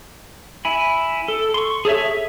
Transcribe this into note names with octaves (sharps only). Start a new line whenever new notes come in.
E4 G#5 B5
A4
C6 C#6
G#4 A4 C#5 E5
E5